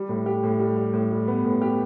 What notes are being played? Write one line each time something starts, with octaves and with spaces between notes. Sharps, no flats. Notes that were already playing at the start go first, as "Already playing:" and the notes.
Already playing: G3
A2
G4
A2
G3
G3
A2
G3
B3
A2
G4